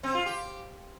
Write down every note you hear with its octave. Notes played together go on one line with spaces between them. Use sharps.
C4
F4
G4